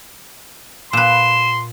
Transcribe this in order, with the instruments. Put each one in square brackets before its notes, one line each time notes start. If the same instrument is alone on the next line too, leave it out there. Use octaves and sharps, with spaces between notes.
[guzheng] A#2 B4 [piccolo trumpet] C6 [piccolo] E7